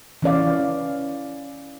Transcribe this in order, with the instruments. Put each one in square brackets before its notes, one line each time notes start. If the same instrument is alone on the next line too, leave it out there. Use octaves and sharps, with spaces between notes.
[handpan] E3 C#4 D5 F5